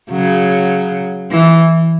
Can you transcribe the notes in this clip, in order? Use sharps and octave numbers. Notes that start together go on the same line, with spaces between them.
C#3 F#3
E3